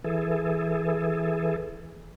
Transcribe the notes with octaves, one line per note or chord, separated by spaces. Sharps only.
E3 G#4 A4